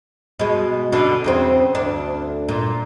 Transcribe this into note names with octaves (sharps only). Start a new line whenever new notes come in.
B2 G#3
B2 D3 D4
E2 C#3 C4
D2 D4
A#2